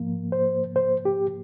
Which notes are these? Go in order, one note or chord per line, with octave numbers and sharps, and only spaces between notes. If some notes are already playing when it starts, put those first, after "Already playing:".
Already playing: G#2 F3 A#3
C5
C5
G4